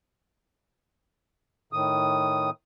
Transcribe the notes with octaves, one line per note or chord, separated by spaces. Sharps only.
A2 D#3 D#6